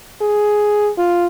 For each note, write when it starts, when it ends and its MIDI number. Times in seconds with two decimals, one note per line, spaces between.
0.21 0.90 68
0.98 1.26 65